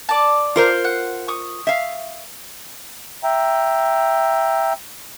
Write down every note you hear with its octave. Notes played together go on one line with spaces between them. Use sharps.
D5 A5
F4 A#4 C5
F#5
C#6 D#6
E5 F5
E5 G5 A#5